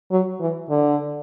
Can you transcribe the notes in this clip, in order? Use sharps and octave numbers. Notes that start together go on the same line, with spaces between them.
F#3
E3
D3